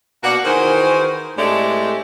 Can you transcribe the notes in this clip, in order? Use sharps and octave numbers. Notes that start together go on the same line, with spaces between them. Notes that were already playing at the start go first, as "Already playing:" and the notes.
B2 A#3 D4 F#4 F#5
D#3 E3 F#4 G#4 A#4 C5
A2 G#3 A3 C4 D4 G4